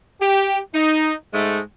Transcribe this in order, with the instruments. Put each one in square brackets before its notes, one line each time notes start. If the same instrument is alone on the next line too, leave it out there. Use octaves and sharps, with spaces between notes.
[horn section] G4
D#4
G#2 G#3 A3